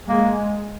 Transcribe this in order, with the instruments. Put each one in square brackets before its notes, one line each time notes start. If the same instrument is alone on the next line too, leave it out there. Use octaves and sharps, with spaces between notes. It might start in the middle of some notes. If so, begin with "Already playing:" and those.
[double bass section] G#3 [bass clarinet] A#3